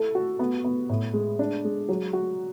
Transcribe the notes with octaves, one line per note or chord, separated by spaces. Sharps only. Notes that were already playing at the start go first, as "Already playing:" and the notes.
Already playing: E4 A4
F#4
B3
B3
A2
G#3
D4
G#3
F#3
F#4